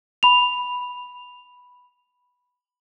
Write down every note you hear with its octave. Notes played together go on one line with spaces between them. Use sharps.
B5 F7